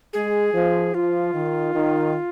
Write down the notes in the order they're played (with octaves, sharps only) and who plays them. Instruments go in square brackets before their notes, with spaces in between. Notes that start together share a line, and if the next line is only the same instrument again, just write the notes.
[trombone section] G#3 [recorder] G#4
[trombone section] F3
[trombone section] F3 [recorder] F4
[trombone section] D#3
D#3